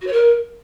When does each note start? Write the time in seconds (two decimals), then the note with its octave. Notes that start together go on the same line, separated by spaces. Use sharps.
0.01 F#4
0.07 C#5
0.12 A#4